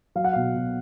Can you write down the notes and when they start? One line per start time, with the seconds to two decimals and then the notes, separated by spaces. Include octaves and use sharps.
0.15 F#3 F5
0.24 F#5
0.33 B2 F5
0.56 B2